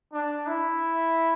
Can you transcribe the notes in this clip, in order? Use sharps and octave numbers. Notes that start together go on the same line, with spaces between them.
D4
E4